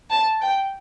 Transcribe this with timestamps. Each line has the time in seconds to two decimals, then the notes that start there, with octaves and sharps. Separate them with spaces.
0.10 A5
0.40 G5